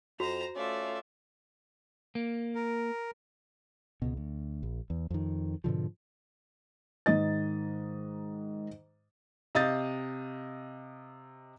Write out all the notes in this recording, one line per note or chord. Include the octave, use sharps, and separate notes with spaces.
F2 F#4 C5 A#5 F7
A3 C#4 F4 D5 E5
A#3
A#4
C#2 B2
D2
A#1
E2
F2 D#3
G#2 B2 D3 F3
G#2 D#3 D#4 D#5 A6
C3 D#5 F5 D#6 G6 A6